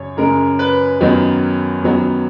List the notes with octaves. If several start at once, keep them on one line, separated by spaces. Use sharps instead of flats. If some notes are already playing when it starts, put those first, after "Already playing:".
Already playing: F#2 C#3 C#5
F#2 C#3 G#3 A#4
B4
F#2 D#3 F#3 B3
F#2 D#3 F#3 B3